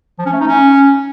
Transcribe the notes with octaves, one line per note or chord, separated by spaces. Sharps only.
F3
C#4
A3
D#4
C#4